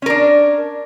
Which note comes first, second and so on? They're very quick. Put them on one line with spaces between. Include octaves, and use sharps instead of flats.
C#4 A#4 D4